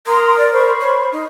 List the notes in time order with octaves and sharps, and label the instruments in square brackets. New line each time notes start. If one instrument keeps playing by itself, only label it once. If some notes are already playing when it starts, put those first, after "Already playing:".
[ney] A#4 [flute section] A#5 C6 D#6
[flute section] D5
C5 B5 C#6
[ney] C#5
D#4